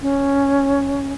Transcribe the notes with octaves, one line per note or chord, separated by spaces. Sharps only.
C#4